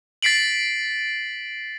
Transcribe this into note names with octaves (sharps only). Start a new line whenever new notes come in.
A6 B6 C7 D7 F#7